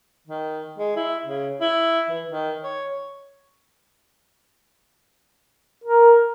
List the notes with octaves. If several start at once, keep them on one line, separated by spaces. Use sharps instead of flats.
D#3
G#3
E4
C#3
E4
E3
D#3
C#5
A#4